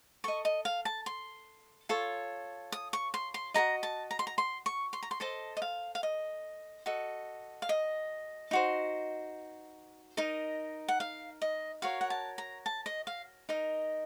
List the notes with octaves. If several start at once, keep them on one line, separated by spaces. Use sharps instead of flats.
A4 D#5 C#6
D#5
F5
A5
C6
F4 A4 C#5
D#6
C#6
C6
C6
F#4 A4 D#5 A#5
A5
A#5
C6
A#5
C6
C#6
C6
A#5
C6
A4 C5 D#5 A5
D#5
F5
F5
D#5
F#4 A4 D#5
F5
D#5
D#4 F#4 C5
D#4 A#4 D#5
F#5
F5
D#5
F#4 A#4 C#5 F5
F#5
A5
A#5
A5
D#5
F5
D#4 A#4 D#5